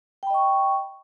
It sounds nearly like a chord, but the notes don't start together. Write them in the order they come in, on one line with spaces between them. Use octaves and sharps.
G5 B5 D#5 C#6